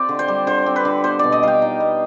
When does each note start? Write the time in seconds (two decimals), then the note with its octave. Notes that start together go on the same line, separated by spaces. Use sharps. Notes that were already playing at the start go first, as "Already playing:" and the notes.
Already playing: C4 F4 G4 D5
0.09 D3
0.19 C5
0.28 G3
0.47 D3 C5
0.66 C4
0.76 B4
0.85 D3
1.04 B3 C5
1.19 B2 D5
1.32 D#5
1.43 G3 F5 G5
1.62 D#4
1.80 B3